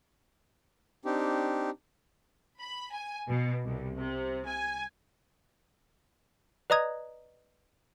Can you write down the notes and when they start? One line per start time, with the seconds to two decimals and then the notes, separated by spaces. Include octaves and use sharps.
1.05 C4 D4 D#4 G4
2.61 B5
2.93 G#5
3.28 B2
3.64 C2
3.98 C3
4.47 G#5
6.70 B4 D5 D#5 A#5 D#6 G#6